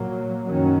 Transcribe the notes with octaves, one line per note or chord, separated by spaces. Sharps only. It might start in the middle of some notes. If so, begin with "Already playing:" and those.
Already playing: A#2 F#3 A#3
F#2 D#3 F#3 C#4